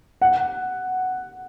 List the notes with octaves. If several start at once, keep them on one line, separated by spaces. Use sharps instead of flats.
F#5